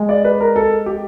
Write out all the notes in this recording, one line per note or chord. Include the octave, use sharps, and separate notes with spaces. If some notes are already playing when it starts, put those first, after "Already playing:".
Already playing: G#3
D5
B4
A#4
A4
G4